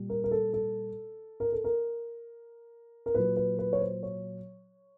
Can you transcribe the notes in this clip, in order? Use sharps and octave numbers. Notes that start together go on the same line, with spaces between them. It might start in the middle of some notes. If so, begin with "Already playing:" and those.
Already playing: A#2 G3
A#4
A#4
A4
A4
A#4
A4
A#4
A#4
A#2 F#3 B4
B4
B4
C#5
C5
C#5